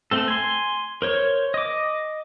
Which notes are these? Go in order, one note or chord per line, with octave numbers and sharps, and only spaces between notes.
A3 C4 A4
G#5 C6
A#4 C5 C#5
D#5 D6